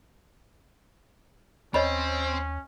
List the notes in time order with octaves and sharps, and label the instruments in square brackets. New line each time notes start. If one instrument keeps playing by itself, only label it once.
[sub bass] D#2 [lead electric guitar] C4 [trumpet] C#4 [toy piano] C#5 D#5 B5